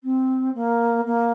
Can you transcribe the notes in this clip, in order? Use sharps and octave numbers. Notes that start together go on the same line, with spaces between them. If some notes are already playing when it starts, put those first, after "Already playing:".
C4
A#3
A#3